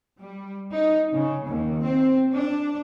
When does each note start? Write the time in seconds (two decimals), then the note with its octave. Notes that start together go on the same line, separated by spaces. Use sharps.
0.21 G3
0.73 D#4
1.12 C#3
1.48 D#2
1.83 C4
2.34 D4